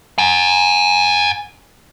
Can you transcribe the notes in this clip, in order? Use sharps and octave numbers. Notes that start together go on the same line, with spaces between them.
F#5 G#5